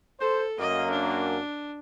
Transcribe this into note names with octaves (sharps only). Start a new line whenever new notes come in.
A4 C5
F#2 A#3 D#5
D4